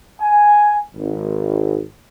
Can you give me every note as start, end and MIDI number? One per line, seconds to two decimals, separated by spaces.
0.21 0.79 80
0.95 1.82 32